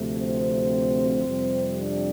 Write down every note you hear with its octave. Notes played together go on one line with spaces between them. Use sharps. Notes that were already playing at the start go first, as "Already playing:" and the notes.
Already playing: D2 C3 F3 A3
C4 C5
F2 C3 G3
D4 D5